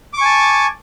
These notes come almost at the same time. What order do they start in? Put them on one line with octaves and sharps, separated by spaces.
D6 C#6 G#5 A5